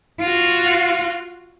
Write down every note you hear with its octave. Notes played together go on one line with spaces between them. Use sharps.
F4 F#4